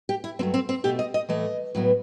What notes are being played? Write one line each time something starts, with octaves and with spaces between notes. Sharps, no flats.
G4
E4
G2 F#3 A3 C4
C4
C4
B2 A3 G4
D#5
D#5
A2 E3 A3 D#5
A2 F#3 B3